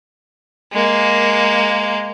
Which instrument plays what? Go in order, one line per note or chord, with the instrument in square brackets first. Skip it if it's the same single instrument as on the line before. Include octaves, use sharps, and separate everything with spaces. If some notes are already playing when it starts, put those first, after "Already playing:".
[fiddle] G#3 A#3